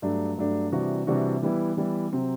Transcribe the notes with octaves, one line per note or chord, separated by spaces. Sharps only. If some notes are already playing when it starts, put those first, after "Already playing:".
G2 F#3 A3 D4
G2 F#3 A3 D4
C3 E3 G3 D4 F#4
C3 E3 G3 D4 F#4
E3 G3 B3 E4
E3 G3 B3 E4
C3 F#3 C4